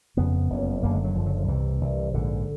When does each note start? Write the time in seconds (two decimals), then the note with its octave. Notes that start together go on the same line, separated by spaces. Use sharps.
0.17 F#1 F2 C#3 B3
0.50 F#1 F2 C#3
0.83 F#1 F#2 D3 A#3
0.93 G#3
1.04 F#3
1.15 F#1 F#2 D3 F3
1.26 F#3
1.37 F3
1.48 C2 C3 E3
1.81 C2 C3
2.14 A#1 G#2 D3